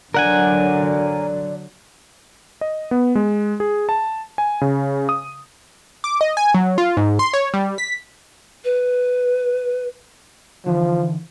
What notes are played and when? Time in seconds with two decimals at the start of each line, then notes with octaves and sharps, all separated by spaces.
0.14 D3 F#3 A#4 D5 F#5 G#5
2.61 D#5
2.91 B3
3.15 G#3
3.60 G#4
3.89 A5
4.38 G#5
4.61 C#3
5.09 D#6
6.04 D6
6.21 D#5
6.37 G#5
6.55 F#3
6.78 F4
6.97 G#2
7.19 C6
7.34 C#5
7.54 G3
7.78 B6
8.65 B4
10.66 D3 E3 F3